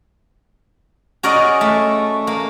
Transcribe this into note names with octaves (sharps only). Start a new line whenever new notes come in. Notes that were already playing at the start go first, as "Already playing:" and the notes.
C#4 F#4 G#4 A#4 D5 D#5
A3
A#3